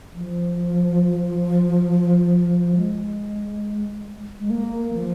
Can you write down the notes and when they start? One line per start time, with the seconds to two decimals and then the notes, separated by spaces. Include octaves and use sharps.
0.14 F3
2.76 G#3
4.39 G#3
4.50 A#3
4.94 F3